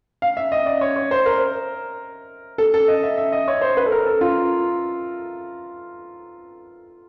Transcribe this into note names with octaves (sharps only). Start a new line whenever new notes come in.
F5
E5
D#5
D5
C#5
C#5
C5
A#4
A4
A4
D#5
E5
E5
D#5
C#5
C5
B4
A4
A#4
A4
F4